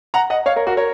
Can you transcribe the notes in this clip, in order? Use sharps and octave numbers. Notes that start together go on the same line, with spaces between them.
F#5 A#5
D#5 F#5
C#5 F5
A#4 C#5
F#4 A#4
A#4 C#5